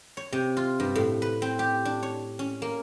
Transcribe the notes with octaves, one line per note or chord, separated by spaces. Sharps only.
C#5
C3
F4
G2
A2
B4
C4
G4
D4
C#5
C#4
A#3